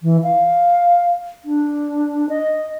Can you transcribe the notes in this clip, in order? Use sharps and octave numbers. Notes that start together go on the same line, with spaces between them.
E3
F5
D4
D#5